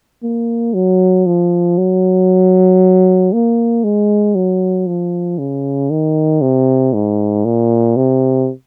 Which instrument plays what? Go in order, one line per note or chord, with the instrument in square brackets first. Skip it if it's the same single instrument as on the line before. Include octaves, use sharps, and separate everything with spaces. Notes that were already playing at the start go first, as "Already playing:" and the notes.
[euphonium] A#3
F#3
F3
F#3
A#3
G#3
F#3
F3
C#3
D#3
C3
G#2
A#2
C3